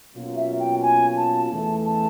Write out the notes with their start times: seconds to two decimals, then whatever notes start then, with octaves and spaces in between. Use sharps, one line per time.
0.14 B2 F#3 A#3 C#4 F4
0.36 E5
0.60 G5
0.82 G#5
1.17 A5
1.51 E2 C#3 E3 A3 A5
1.86 A5